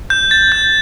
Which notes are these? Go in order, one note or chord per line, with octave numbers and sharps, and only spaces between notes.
G6
A6
G6